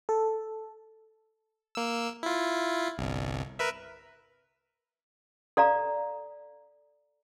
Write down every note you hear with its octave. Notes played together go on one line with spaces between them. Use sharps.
A4
A#3 E6
E4 F4
G1 C2
A#4 B4 E5
A4 D5 F5 A#5